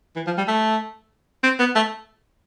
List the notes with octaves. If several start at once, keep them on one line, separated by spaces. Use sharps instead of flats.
E3
F3
G3
A3
C4
B3
A3